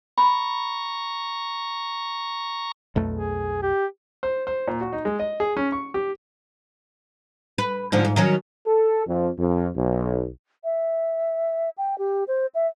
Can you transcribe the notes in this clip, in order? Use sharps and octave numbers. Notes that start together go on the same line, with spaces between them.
A#5 B5 C#6
B1 F2 A3
G#4
G4
C5
C5
A#2
F#4
D#4
G#3
D#5
G#4
C#4
C#6
G4
B4
G#2 D3 F3
G#2
D#3 F#3 C#4
A4
F2
F2
B1
E5
G5
G4
C5
E5